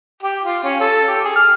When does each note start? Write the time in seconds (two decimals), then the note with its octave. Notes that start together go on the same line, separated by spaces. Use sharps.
0.23 G4
0.44 F4
0.64 C#4
0.81 A4
1.08 G4
1.24 G#4
1.36 F6